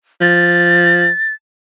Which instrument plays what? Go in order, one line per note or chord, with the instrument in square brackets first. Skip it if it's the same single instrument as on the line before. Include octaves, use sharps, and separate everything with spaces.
[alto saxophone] F3 [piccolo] A6